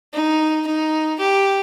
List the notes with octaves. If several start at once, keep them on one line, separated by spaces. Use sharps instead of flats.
D#4
D#4
G4